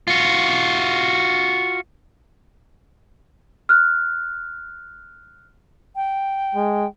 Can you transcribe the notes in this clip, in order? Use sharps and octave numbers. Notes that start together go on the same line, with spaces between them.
F4 F#4
F6 F#6
G5
G#3